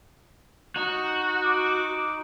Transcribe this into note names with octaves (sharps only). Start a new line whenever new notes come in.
D#4 F#4
D6